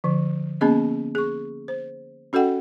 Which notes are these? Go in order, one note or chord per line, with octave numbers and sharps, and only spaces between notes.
D3 F3
A#3 B3 C#4 G#4 D#5
G#4 C#6
C5
C#4 F#4 A4 D#5 F#5 G5